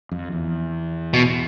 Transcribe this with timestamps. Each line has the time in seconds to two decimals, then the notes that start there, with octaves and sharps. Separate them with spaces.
0.11 F2
0.32 E2
1.13 B2